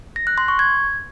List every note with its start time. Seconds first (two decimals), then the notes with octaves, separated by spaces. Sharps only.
0.16 A#6
0.27 F#6
0.38 C6
0.48 C#6
0.59 G#6